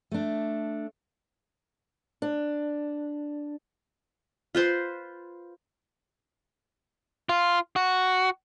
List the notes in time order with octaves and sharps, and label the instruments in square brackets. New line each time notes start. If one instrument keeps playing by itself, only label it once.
[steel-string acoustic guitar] A3 D4
D4
[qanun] F4 B4 C5
[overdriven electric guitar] F4
F#4